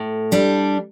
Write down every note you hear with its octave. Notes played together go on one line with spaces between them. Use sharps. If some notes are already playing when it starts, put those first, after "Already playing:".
Already playing: A2
G3 D4